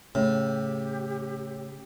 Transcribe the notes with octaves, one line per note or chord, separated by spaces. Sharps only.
A2 C#3 G4